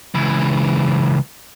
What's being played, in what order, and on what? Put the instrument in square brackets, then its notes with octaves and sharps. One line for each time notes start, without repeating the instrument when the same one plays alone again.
[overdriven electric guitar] C#2 E3